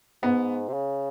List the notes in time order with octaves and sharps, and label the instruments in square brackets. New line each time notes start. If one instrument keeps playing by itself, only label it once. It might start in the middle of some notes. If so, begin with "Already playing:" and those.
[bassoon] G#2 [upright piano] B3
[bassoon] C3
C#3